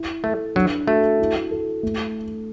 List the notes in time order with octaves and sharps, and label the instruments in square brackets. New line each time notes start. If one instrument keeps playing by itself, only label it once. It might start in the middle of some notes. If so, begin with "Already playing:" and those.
Already playing: [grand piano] E4
[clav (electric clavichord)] A3 [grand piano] A4
[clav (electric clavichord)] F#3 [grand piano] D4
[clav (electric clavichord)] A3 [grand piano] F#4
[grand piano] E4
A4
A3